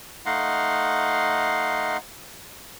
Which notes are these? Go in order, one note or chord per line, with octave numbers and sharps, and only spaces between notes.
A3 D#4 D#5 F5 F#5 C6